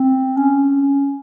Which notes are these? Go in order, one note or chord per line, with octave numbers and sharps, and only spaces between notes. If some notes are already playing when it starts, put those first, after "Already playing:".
Already playing: C4
C#4